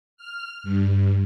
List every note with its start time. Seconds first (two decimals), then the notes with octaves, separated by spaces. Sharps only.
0.17 F6
0.63 G2